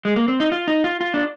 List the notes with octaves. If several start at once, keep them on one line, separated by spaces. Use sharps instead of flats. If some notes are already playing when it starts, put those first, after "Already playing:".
G#3
A#3
C4
D#4
F4
D#4
F4
F4
D4